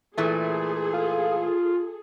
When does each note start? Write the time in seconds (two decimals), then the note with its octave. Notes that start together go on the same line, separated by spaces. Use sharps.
0.17 A#2 E3 A3 G#4 A4
0.93 F4